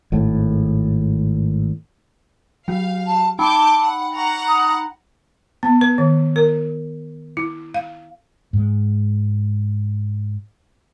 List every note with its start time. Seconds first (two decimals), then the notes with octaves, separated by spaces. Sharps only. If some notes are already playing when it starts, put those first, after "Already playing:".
0.12 G#1 A2
2.68 F#3 F#4 F5
3.06 A5
3.39 D#4 G5 A5 B5 D6 G6
3.81 F#5
4.15 F#5 A#5 C#6
4.47 D#6
5.63 B3
5.81 B4
5.98 D#3
6.36 A#4
7.37 E4
7.74 F5
8.53 G#2 G#3